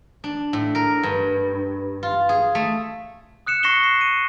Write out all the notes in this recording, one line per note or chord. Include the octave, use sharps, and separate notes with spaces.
D4
A2
A#4
G2
F4
G#4
A3
D#6 F#6 C#7 E7
C#6 A#6 C7 C#7 E7 G7
C7 G7
D#7